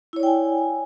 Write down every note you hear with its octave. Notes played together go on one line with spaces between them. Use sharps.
E4 C#5 D5 G5 G#5